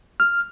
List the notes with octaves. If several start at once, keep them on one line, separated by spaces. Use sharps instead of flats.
F6